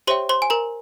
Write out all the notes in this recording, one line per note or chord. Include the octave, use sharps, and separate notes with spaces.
G4 C5 C#5 E5 G5 C6
C5 C6
G#5
A#4 A#5